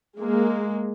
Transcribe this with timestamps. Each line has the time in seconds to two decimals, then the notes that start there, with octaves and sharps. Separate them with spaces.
0.18 G#3 A#3